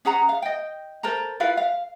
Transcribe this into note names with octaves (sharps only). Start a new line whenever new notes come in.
C#4 G#4 F#5 A#5
F5
D#5 G5
A4 A#4 C5 A#5
E4 F4 B4 F5
F5